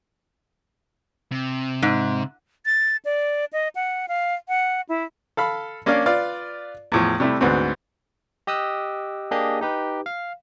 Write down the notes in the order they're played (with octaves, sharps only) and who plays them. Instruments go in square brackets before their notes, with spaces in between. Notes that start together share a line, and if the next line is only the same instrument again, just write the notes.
[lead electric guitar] C3
[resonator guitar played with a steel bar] G#2
[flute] A6
D5
D#5
F#5
F5
F#5
E4
[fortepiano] A4 F5 B5
A#3 C#4 D4 D5 F5
F4 B4 D5 F5
E2 A2 F3
C3 G3 A3 E4
D2 G#2 B3 C4 F#4
[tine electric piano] G4 D#5 D#6 E6 F#6
A#3 D4 G4 G#4 D#5
D#4 G4 B4
F5